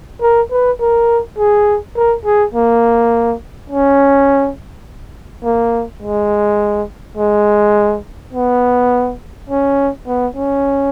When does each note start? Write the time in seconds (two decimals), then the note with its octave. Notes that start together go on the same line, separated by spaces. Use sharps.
0.22 A#4
0.51 B4
0.81 A#4
1.38 G#4
1.96 A#4
2.25 G#4
2.54 A#3
3.70 C#4
5.44 A#3
6.02 G#3
7.17 G#3
8.33 B3
9.50 C#4
10.07 B3
10.37 C#4